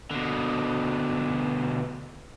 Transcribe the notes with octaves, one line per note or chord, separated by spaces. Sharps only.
B2 D3